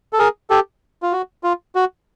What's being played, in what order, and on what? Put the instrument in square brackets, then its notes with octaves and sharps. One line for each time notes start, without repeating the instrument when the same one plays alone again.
[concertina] A4
G#4 A#4
G4 A4
F4
F#4
F4
F#4